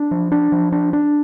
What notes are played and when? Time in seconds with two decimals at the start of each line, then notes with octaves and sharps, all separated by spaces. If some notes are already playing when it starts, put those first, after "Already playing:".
Already playing: D4
0.11 F3
0.32 D4
0.52 F3
0.72 D4
0.93 D4